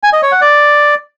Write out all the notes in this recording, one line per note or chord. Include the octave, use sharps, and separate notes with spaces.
G#5
D#5
C#5
F#5
D5